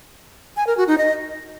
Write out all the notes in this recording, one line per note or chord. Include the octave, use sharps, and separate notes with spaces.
G#5
A#4
F#4
D#4
D#5